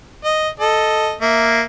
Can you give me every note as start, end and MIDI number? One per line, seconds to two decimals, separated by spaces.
0.24 0.49 75
0.60 1.15 69
0.60 1.15 75
1.21 1.62 58
1.21 1.62 76